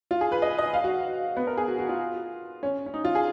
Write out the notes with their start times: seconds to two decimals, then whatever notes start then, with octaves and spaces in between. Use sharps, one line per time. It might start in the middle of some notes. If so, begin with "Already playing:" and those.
0.11 F4
0.21 G#4
0.32 B4
0.42 D#5
0.58 D#5
0.74 F5
0.84 F#4
1.37 B3
1.47 A#4
1.57 G#4
1.68 F#4
1.78 F#4
1.89 F4
2.63 C#4
2.86 C#4
2.94 D#4
3.04 F4
3.15 G#4